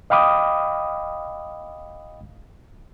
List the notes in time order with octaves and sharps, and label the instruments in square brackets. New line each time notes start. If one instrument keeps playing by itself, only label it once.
[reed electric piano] D#5 F5 G5 B5 D6 D#6